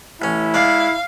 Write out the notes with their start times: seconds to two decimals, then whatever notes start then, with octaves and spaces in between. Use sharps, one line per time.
0.22 A1 C#4 E4
0.54 G#3 D5 F5